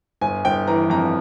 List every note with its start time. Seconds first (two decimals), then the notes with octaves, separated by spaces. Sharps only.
0.21 G1 G#5
0.45 G1 G5
0.67 E3 A#5
0.90 F2 A#5